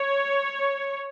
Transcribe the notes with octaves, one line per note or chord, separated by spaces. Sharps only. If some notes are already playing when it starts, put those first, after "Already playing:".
Already playing: C#5